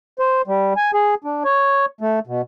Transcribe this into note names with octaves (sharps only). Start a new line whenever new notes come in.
C5
G3
G#5
G#4
D4
C#5
A3
B2